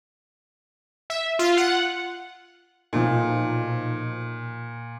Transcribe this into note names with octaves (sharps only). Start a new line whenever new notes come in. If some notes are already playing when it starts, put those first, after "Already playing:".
E5
F4
F#5
B1 A#2 F3